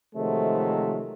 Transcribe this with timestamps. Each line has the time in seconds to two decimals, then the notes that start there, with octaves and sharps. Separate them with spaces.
0.16 C3 D#3 F3 F#3 G#3 A3